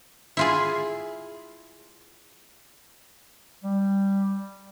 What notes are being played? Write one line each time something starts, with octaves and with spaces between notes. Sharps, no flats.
E4 F4 G#4
G3